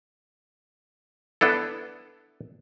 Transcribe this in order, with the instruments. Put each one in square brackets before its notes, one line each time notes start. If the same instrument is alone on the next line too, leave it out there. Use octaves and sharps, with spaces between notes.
[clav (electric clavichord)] B3 D4 E4 A4